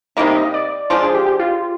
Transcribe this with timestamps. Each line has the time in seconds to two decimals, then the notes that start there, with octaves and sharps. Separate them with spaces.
0.17 C3 G3 A#3 D#4 D#5
0.35 D#5
0.54 D5
0.90 F3 G#3 D4 F4 C5
1.02 G#4
1.14 G4
1.27 G4
1.39 F4